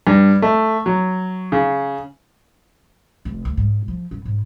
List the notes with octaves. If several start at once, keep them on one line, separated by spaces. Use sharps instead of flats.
G2
A3
F#3
C#3
F1
D2
G#2
F3
F#2
G#2